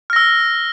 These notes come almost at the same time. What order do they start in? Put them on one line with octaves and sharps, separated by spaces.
F6 A#6 E6